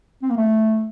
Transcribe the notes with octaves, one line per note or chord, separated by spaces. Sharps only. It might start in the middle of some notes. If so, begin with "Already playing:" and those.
C4
A#3
A3